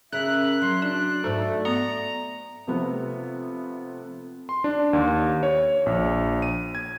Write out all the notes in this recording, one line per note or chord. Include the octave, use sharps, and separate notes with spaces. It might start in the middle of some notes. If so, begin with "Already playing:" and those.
C#3 A#4 E5 F#6
F#3 C6
D4 D5
G#2 A3
B3 A#5
C3 F3 A3 B3
C6
D4
D#2
C#5
A#1
D#7
G#6